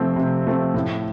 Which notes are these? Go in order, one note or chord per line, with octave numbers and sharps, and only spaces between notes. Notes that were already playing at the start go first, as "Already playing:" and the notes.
Already playing: C3 F3 A3 C4
C3
F3 A3 C4
A2